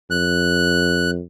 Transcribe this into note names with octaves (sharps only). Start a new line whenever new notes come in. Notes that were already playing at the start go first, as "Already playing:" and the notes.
F2 F#6